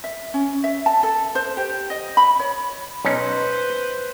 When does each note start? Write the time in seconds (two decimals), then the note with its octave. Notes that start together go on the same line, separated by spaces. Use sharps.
0.04 E5
0.34 C#4
0.64 E5
0.86 A5
1.03 A4
1.35 C5
1.57 G4
1.90 D#5
2.17 B5
2.39 C#5
3.05 B1 C#4 D#4 B4 C5